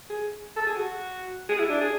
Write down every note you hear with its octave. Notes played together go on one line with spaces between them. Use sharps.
G#4
A4
G#4
F#4
G#4
E4
D4
G#4